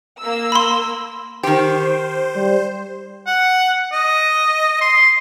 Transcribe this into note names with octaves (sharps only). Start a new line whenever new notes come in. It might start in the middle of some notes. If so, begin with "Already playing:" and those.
A#3 E6
B5 C6
D#3 G4 C5
G3
F#5
D#5
C6